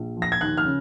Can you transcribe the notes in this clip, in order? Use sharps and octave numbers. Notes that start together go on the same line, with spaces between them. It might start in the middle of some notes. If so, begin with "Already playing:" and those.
Already playing: A#1
F3
A#6
G#6
D#2 F#6
F6
C#3